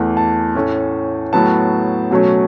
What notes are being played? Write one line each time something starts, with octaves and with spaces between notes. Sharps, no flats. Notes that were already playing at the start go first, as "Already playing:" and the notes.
Already playing: E2 E3 A3
A5
A2 A3 C#4
A2 F#3 B3 A5
B2 F#3 A3 C#4